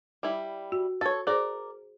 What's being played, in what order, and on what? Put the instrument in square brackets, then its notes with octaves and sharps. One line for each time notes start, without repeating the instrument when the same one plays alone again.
[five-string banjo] G3 E4
[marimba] F#4
[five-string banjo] A4 C#5 [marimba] A6
[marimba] G#4 C5 [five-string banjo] A#4 D5